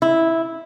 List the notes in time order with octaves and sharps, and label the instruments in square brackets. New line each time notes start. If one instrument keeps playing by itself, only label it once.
[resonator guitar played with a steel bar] E4